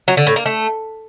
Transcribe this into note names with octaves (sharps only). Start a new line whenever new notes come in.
F#3
D3
A2
A#3
A3